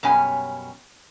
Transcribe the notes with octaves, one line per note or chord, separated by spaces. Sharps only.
F#2 B2 G3 C#4 G#5